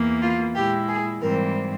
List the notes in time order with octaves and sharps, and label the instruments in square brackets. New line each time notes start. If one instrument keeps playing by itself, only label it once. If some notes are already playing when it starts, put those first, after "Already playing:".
Already playing: [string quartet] E2 E3 A#3
F4
A#2 G#3 E4 G4
G#4
G#2 E3 G3 C4 A#4